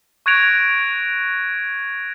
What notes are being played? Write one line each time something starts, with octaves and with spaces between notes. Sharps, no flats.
C#6 F#6 G#6 A#6 D7 F7